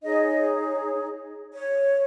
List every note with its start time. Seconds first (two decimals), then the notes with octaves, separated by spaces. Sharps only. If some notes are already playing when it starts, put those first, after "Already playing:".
0.03 D#4 G#4 C#5 D#5
1.52 C#5